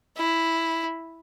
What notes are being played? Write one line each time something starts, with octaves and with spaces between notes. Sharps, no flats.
E4